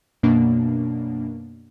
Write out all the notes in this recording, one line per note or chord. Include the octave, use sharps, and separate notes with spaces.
F#2 B2 A#3 D4